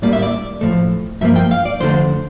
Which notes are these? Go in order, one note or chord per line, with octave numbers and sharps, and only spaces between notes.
A2 G3 A#3 D5
E5
D5
A2 F3 A3
G2 F3 A#3 E5
G5
F5
D5
F2 D3 A3 C5